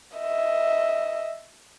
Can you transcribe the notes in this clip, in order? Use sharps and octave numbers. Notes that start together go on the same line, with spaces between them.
D#5 E5